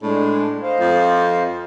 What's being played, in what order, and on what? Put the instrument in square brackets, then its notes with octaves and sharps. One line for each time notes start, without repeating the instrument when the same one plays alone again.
[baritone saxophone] A2 [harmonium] G#3 D4
[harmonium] C5 D#5 F5
[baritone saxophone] F2